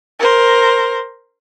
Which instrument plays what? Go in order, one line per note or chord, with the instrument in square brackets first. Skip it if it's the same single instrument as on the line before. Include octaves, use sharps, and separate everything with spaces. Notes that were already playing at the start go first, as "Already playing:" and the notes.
[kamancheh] A#4 C5